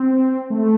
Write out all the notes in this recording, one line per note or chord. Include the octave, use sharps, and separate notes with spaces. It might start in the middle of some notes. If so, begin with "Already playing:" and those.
Already playing: C4
A3